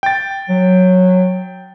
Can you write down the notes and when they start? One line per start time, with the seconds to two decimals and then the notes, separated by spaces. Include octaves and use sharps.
0.03 G5 A6
0.49 F#3